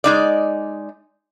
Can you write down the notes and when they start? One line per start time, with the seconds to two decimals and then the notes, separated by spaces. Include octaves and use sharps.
0.04 G#3 D#4 D5